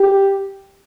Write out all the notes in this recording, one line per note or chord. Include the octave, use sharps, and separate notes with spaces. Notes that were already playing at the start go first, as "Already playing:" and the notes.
Already playing: G4